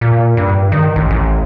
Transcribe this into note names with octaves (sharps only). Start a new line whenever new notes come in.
A#2
G2
D#3
A1
A1